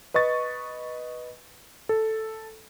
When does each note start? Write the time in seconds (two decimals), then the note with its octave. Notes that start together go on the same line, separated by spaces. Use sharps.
0.14 B4 D#5 C#6 A6
1.89 A4